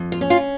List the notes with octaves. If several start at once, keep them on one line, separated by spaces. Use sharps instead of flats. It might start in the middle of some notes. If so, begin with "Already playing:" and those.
Already playing: F2
F4
C#4
F4